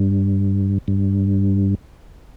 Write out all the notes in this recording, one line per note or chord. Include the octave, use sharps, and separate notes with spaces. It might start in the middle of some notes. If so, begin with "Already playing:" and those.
Already playing: G2
G2